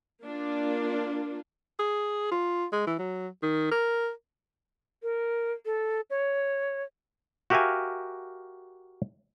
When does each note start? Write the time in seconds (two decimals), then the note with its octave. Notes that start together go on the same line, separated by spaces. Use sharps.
0.24 A#3 D4 F4
1.79 G#4
2.31 F4
2.72 G#3
2.87 E3
2.99 F#3
3.43 D#3
3.71 A#4
5.03 A#4
5.66 A4
6.10 C#5
7.50 F#4 G4 A#4 E5 F5 G#5